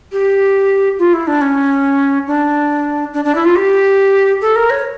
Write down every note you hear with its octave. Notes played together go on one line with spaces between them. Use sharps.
G4
F4
E4
D4
C#4
D4
D4
D4
E4
F4
G4
A4
A#4
C#5